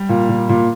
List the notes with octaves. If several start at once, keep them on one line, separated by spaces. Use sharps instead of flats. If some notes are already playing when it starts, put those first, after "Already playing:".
Already playing: G3
A#2
A#2
A#2